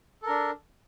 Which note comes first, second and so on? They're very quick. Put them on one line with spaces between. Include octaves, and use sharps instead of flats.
A4 A#4 D4